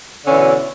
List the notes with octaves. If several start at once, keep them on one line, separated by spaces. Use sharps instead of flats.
B2 D3 E3 C#4